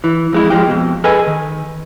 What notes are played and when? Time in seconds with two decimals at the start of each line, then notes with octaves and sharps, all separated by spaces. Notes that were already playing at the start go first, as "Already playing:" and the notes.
0.04 E3
0.33 F2 G#3 E4
0.50 F3 F#3 G#3 G4
0.67 F2 B2
1.04 G#4 A4 B4 D#5 G#5
1.27 D#3